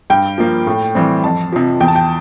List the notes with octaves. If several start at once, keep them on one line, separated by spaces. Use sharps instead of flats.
G2 G5
F3 A#3
A2
E3 G3 C4
F2 A5
C3 F3
E2 G5
A5
G5